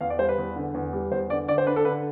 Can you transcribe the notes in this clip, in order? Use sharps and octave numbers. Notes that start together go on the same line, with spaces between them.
E2 F5
D5
G3 C5
B4
E2
D3
E2
G3
E2 C5
D3 D5
D3 D5
C5
D4 B4
A4
D3 B4